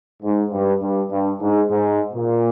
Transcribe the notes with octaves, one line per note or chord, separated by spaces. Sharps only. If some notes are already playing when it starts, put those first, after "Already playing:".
G#2
G2
G2
G2
G#2
G#2
A#2